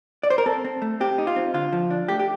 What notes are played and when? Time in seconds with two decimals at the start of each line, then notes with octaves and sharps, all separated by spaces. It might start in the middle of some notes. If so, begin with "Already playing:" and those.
0.23 D5
0.30 C5
0.38 A#4
0.46 C4 A4
0.64 C4
0.82 A3
1.00 C4 G4
1.18 D#4
1.27 F4
1.36 C4
1.54 D3 F4
1.72 F3
1.90 D4
2.08 A3 G4
2.19 G4